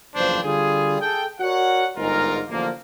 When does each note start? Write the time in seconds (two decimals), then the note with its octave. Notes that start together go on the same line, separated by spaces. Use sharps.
0.15 F#1 E2 G2 F3 D4 C5
0.44 D3 G3 F4 G#4
1.01 G#4 A4 G5
1.40 F#4 A#4 C#5 D5 F#5
1.96 G1 G#2 G#3 D#4 F4 A#4
2.49 A1 D3 F3 A#3